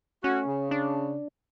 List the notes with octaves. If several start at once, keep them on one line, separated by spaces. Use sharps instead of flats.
A3 C#4 F#4
C#3
D4